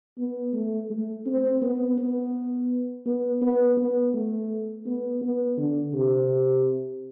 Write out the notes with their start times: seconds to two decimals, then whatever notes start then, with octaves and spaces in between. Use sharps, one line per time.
0.18 B3
0.53 A3
0.90 A3
1.26 C4
1.62 B3
1.98 B3
3.06 B3
3.42 B3
3.77 B3
4.14 A3
4.86 B3
5.21 B3
5.57 D3
5.93 C3